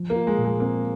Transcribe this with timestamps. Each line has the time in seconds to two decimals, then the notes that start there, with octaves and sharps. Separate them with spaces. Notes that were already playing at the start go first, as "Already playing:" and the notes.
Already playing: F3
0.10 A#3
0.16 F4
0.27 G#3
0.38 A#2
0.44 G#3
0.60 A#3 C4